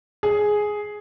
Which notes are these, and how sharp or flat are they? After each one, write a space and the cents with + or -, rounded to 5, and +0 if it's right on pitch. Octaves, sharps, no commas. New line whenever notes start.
G#4 +5